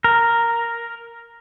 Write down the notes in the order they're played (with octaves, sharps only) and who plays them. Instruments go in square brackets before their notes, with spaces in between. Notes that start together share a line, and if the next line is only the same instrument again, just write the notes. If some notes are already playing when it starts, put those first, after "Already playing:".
[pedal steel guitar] A#4